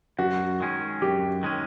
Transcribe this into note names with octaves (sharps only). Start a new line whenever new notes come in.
F#2 F#4
D#3 G#3 C#4
F#2 G4
D#3 G#3 C#4